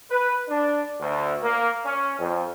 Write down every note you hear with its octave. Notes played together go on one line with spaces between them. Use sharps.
B4
D4
D2
A#3
C#4
F2